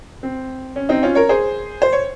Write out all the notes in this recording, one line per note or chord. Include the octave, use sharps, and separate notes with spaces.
C4
C#4
C4 D#4
C#4 F4
A#4 C#5
G#4 C5
C5
C#5